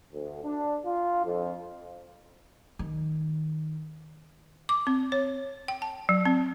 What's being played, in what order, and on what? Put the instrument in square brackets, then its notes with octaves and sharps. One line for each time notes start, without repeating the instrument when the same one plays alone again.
[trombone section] D2
D4
F4
F2
[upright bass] D#3
[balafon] D6
C4
C#5
G5
A5
F#3
C4